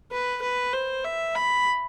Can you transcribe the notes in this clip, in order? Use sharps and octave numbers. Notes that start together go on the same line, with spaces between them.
B4
B4
C5
E5
B5